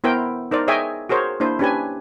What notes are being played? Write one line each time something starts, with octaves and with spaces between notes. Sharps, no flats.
B3 E4 A#4 C5 G5
D#4 A#4 C5 D5
G#4 C#5 D#5 E5 G5 G#5
F#4 G#4 A#4 C5 C#5
A#3 D4 E4 C5
C#4 D4 G4 B4 G#5